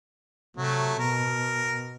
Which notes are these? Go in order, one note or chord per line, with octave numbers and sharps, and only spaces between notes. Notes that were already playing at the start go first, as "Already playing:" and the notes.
C3 F#3 A3
B2 A#4